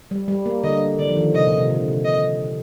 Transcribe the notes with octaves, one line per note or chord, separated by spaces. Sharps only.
G3
G3
A#3
D3 D#5
D3 D5
F3
D#3
C3 D#5
A#2
C3
D3
C3
D#5